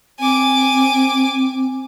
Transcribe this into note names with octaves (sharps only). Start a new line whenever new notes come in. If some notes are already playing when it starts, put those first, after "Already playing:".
C4 G#5 D6